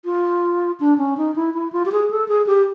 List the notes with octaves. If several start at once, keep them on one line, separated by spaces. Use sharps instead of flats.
F4
D4
C#4
D#4
E4
E4
F4
G4
G#4
A4
G#4
G4